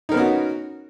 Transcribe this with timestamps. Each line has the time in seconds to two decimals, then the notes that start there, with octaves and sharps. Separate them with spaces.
0.09 D#4
0.12 A#4
0.14 B3
0.17 C#4
0.19 F#4